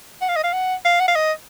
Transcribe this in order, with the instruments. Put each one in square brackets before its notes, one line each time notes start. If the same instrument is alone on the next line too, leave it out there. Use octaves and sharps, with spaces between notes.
[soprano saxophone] F#5
F5
D#5
F5
F#5
F5
F#5
F5
D#5